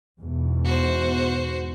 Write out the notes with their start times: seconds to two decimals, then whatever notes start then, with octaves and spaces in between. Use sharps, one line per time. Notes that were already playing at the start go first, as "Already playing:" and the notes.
0.19 E2 G#2 B2
0.64 F#4 C5